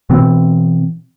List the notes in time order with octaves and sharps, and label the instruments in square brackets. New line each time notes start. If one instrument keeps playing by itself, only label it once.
[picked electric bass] B2 E3 C4